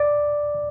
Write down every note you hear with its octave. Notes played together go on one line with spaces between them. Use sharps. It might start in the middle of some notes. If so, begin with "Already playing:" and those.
Already playing: D5